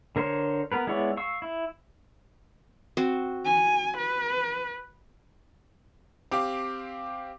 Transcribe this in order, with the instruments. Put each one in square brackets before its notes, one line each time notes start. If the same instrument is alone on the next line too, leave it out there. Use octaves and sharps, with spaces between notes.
[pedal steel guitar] D3 A#4 C5 C#5
B3 A#4 B4
G#3 B3 E4 C#5 D5
F5 C#6 E6
E4
[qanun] C4 F#4
[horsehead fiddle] G#5
B4
[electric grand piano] C4 G4 F5 [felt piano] D6